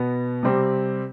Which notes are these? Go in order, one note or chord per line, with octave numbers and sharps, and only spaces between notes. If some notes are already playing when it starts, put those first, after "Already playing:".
Already playing: B2 B3
C3 G3 C4